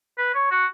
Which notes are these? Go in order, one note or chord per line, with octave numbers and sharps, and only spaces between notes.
B4
C#5
F#4